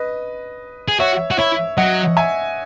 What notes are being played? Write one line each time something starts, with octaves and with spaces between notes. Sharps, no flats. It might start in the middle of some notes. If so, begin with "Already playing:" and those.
Already playing: B4 D#5
G#4
F#4 C#5 E5
F#4
E4 C#5 E5
F#3 D#5 F#5
E5 G#5